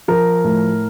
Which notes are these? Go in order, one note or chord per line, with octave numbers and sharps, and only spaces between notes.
F3 A#4
A2